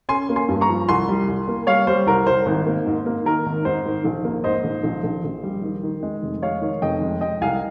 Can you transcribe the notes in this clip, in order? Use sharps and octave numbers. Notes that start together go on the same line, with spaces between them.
C#4 G#5 C6
A#3
G#5 C6
G2
A#5 C#6
F3
C2 G#5 C6
G3
C2
A#3
G3 C#5 F5
G3 C5
C2 A#4
C2 C5
G#1
A#3
G#2
A#3
D#3 A#4
G#1
G#2 C5
D#3
A#1
A#3
G#2 C5 D#5
A#1
A#1
A#1
A#1
G3
D#3
D#3
G#3
F1
G#3 C#5 F5
D#3
F1 D#5 G5
G#3
G#3 D#5 G5
C2 F5 G#5